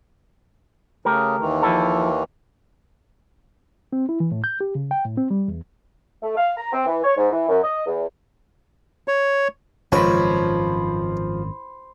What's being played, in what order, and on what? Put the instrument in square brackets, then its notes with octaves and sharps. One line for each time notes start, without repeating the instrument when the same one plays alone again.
[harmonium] C#3 [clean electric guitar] A3 G4 A#4
[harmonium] D#2 D#3 E3
[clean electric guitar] F3 E4 A4
[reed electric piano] C4
E4
E3
A2
G6
G4
C#3
G5
A2
C4
G3
E2
[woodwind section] A3
F5
A#5
C4
E3
C#5
G#2
E3
F#2
D#5
E2
[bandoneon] C#5
[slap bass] G#1 F#2 [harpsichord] C#2 C#5 [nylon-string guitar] F3 [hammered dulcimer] C5 B5